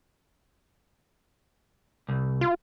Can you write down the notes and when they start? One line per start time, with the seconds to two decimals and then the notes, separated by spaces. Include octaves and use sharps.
2.09 C2
2.41 F4